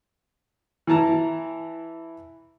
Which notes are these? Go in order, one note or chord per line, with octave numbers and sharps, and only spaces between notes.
E3 E4 A5 A#5